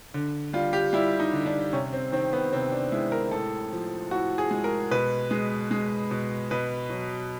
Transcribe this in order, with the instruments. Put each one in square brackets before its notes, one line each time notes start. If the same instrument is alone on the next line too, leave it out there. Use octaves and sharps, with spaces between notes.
[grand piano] D3
G3 F4
G4
G3 E4
D#4
D3
D4
C3 C#4
C4
D#3 C4
B3
C3 C4
D4
G#3 E4
A#4
A2 A4
F3
A2 F#4
G#4
G#3
A#4
B2 B4
G#3
G#3
B2
B2 B4
F#3